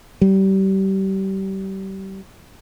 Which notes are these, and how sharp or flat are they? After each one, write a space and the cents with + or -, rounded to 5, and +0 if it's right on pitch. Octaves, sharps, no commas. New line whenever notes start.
G3 -30